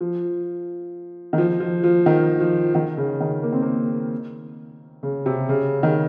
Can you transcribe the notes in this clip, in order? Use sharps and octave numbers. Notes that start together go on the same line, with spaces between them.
F3
D#3
F3
F3
F3
D#3
F3
D#3
C#3
D#3
A#3
C4
A#3
C#3
C3
C#3
D#3